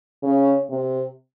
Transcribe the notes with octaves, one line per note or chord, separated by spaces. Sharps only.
C#3
C3